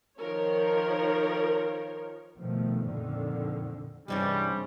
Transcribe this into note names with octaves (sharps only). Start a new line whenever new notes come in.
D#3 F3 F4 A#4 C#5
B2 D#3 F3 A3
F2 A#2 D3 D#3
C2 G2 E3 G3 G#3 C4 C#4